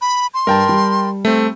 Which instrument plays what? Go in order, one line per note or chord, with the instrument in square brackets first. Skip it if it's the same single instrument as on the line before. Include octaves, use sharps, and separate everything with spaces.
[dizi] B5
C6
[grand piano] G2 [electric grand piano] A#4 G5 A5
[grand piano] G3
[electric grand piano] A3 C4